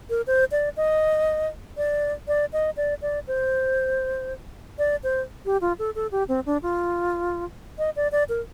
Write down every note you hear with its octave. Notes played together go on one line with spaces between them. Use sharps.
A#4
C5
D5
D#5
D5
D5
D#5
D5
D5
C5
D5
C5
G4
F4
A4
A4
G4
C4
D4
F4
D#5
D5
D5
A#4